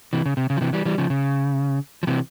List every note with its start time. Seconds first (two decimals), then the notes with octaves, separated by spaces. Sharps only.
0.13 C3 E3
0.26 C#3
0.37 C3
0.50 C#3
0.57 F3
0.61 C3 E3
0.73 E3 G3
0.85 E3 G3
0.98 C#3 F3
1.10 C#3
2.03 F3
2.07 C3 E3